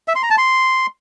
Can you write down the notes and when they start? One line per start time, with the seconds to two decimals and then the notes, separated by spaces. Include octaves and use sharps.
0.08 E5
0.15 C6
0.23 A#5
0.30 A5
0.38 C6